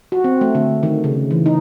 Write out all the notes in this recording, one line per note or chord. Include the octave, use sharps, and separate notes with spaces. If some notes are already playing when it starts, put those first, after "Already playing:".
F#4
C4
A3
D3
D#3
C#3
E3
D#4